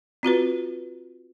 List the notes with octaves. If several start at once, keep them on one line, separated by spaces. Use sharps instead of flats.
C4 F4 F#4 B4